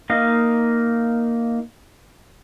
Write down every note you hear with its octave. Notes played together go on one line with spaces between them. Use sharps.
A#3 D#4 D#5 F5